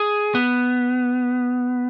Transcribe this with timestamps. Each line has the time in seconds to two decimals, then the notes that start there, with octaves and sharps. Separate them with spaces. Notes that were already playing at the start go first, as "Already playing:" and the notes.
Already playing: G#4
0.35 B3